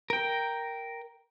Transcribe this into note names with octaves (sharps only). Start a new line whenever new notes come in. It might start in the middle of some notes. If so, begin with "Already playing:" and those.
A#4 G5